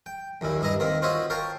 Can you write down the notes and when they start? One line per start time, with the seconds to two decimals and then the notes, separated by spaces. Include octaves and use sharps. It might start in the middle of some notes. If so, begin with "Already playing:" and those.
0.06 G5
0.41 A#1 D#2 A#2 E4
0.61 G2 D4 E4 D#5 A#5
0.80 D#3 A#3 C4 A#4
1.02 F4 F#4 C5 C#5 D#5 E5
1.30 A#4 C#5 F5 G5 A5 A#5